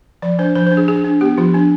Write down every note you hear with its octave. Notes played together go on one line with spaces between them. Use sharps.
F3 D5
D4 C5
F3 C5
C5
D4
G#4
D4 G#4
D4
B3 G4
F3 F4
D4